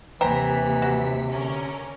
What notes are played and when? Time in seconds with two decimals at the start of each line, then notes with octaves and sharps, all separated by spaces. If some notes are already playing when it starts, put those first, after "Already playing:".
0.21 D#2 C3 E3 C5 G5 A#5 B6
0.82 F#4
1.30 D3 C#4 A#4